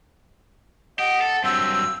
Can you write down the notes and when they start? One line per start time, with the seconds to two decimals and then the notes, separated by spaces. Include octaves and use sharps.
0.99 G4 D#5 F#5
1.21 A4 A5
1.44 G2 F#3 C4 E6